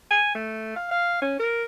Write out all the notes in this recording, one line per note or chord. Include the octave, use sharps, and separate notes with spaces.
G#5
A3
F5
F5
C#4
A#4